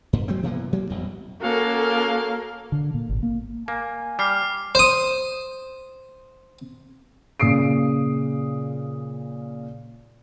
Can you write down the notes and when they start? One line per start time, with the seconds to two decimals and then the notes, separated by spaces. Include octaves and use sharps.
0.13 G2
0.28 F#3 G#3 A3 C4
0.43 B2 E3 A#3 B3
0.73 F#3 G#3 A#3
0.89 A1 F2 B2
1.42 A#3 C#4 F#4 A4 A#4 F5
2.72 D3
2.94 A#2
3.09 G#1
3.23 A#3
3.68 A#3 G#5
4.19 G3 D6 F6 C7
4.75 C5 D#6
7.40 A#2 C#3 D#6 C7 D7